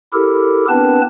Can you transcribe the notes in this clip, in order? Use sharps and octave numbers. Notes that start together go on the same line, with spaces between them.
E4 G4 A4 A#4
B3 C4 D4 B4 A5